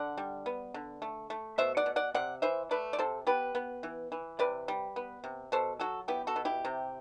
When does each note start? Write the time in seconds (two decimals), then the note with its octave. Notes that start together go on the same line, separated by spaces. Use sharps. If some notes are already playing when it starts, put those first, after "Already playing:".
Already playing: D3 D5 F#5
0.17 G3
0.46 B3
0.74 D3
1.02 A3
1.30 A3
1.58 B2 C5 E5
1.77 D5 F#5
1.86 B2
1.96 D5 F#5
2.14 C3 D5 F#5
2.42 E3 C5 E5
2.71 A3 B4 D5
2.93 D5
2.99 C3 A4 C5
3.27 B3 G4 B4
3.55 B3
3.83 E3
4.12 E3
4.39 C3 B4 D5
4.68 G3
4.96 B3
5.24 C3
5.52 B2 A4 C5
5.80 F#3 F#4 A4
6.08 B3 E4 G4
6.27 F#4 A4
6.36 B2
6.45 E4 G4
6.65 C3